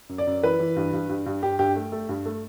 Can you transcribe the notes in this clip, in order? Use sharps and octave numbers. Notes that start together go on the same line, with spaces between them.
F#2
D5
F#2
E3 B4
E3
G2
G2
G2
G2
G2 G4
G2 G4
A3
A3
G2
A3